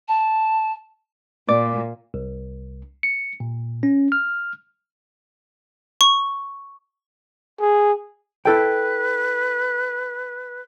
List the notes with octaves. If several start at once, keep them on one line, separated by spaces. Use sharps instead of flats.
A5
A#2 D5
C2
C#7
A#2
C#4
F6
C#6
G#4
E4 A4 B4 G5